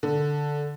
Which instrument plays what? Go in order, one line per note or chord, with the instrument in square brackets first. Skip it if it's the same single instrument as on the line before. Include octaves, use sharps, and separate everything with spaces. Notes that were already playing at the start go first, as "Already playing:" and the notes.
[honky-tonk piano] D3